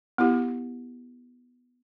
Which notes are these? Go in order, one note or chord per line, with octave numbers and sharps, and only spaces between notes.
B3 E4 G4